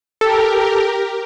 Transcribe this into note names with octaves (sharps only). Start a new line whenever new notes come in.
G4 A4 A#4